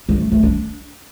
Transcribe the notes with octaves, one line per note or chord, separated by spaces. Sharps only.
G#3
A3
A3
D4